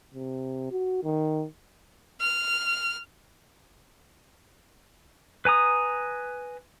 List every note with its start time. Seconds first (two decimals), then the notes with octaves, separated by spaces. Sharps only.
0.14 C3
0.71 F#4
1.03 D#3
2.20 F6
5.45 B4 G#5 A#5 D#6